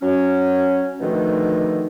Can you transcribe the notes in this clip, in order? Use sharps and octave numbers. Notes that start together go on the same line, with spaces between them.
F#3 C#4
B2 D3 D#3 F3 A3 D#4